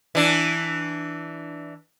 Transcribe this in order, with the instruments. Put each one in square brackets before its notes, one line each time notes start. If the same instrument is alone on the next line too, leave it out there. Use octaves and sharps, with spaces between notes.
[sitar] E3 D4